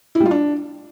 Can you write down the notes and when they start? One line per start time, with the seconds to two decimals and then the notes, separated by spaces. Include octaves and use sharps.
0.15 E4
0.20 G3
0.26 F4
0.31 D4